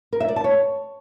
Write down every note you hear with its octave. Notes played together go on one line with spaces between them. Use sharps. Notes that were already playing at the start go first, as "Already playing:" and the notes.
A#4
E5
D5
A5
C#5